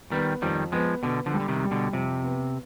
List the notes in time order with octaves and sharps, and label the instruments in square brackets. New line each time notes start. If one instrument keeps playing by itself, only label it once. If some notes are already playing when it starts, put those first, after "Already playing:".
[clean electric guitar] D#3 G3 [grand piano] B3
[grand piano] F2 [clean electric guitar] D#3 G3
[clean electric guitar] F3 G#3 [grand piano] B3
[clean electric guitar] B2 D3 [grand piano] B3
[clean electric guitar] D3 F3
[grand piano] G3
[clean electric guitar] D3
C3 D#3
[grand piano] G3
[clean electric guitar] B2 D3
[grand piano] F2 [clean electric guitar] C3
[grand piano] B3